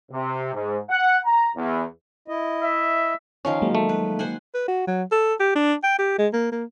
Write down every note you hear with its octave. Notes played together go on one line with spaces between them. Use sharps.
C3
G#2
F#5
A#5
E2
E4 D#5
E5
D#3 F3 C#4 F5
F#3 G#3 A#3
A3
B4
C5 F#5 G#5
B4
F#4
F#3
A4
G4
D4
G5
G4
G#3
A#3
A#3